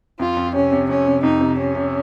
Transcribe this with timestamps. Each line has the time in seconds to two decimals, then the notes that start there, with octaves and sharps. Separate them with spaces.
0.19 F2 F4
0.37 F2
0.55 C3 C#4
0.72 C3
0.89 F2 C#4
1.07 C3
1.23 F2 D#4
1.41 C3
1.58 C3 C#4
1.75 C3